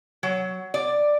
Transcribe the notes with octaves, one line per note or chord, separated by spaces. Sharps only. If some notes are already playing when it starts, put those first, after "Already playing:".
F#3
D5